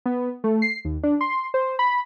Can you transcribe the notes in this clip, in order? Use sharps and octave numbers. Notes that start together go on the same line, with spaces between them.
B3
A3
C7
D#2
D4
C6
C5
B5